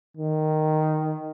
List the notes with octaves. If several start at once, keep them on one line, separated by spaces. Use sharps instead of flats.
D#3